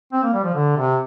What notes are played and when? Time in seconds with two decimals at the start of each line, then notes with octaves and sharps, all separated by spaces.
0.13 C4
0.23 A#3
0.33 G3
0.43 F3
0.54 D3
0.77 C3